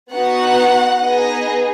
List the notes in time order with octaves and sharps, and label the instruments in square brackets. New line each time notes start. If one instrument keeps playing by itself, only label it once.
[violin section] B3 D#4 F#4 F#5
B3 D#4 G#4 D#5